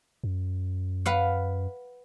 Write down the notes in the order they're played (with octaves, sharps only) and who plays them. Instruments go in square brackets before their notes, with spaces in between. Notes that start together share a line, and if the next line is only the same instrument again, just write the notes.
[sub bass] F#2
[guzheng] B4 F5 F#5